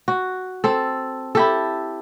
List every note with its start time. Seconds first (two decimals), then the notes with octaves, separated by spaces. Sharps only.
0.08 F#4
0.64 C4 A4
1.35 E4 G4 A4